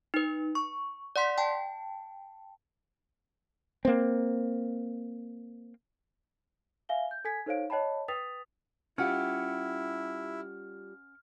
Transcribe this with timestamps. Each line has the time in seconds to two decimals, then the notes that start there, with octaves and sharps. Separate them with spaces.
0.14 D#4 B4
0.55 C#6
1.16 D5 F#5 C6 B6
1.38 G5 A5
3.85 A#3 C4
6.89 E5 F5 G#5 G7
7.11 G6
7.25 A4 G#5 G#6 B6
7.46 D#4 A4 C5 C#5 F5 D7
7.70 C#5 D#5 G5 A5 B5
8.08 B4 G5 D#6 A6 B6 F7
8.98 G3 C#4 E4 F4 G4 F#5 G5 F6